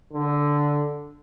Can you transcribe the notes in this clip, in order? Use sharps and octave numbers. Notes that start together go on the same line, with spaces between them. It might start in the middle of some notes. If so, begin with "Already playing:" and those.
D3